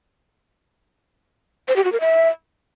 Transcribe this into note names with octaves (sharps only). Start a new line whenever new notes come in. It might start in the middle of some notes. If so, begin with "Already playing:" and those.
C5
G4
F#4
A#4
E5